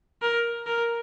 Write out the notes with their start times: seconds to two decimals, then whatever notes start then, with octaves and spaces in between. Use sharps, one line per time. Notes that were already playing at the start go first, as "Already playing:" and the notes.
0.22 A#4
0.67 A#4